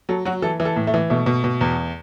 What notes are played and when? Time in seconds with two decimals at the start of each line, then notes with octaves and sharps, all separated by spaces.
0.09 F#3 A4
0.25 F#3 F#4
0.42 E3 A4
0.60 E3
0.65 A4
0.76 A2
0.87 A3
0.94 E3
1.10 B2 A3
1.26 B2
1.44 B2
1.61 E2